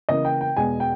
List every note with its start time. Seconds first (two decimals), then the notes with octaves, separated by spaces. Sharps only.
0.09 C#3 E3 A#3 D#5
0.25 G5
0.41 G5
0.57 E2 B2 G#3 B3 G#5
0.80 G5